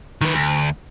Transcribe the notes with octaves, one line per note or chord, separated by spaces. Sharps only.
D#3 B4
D2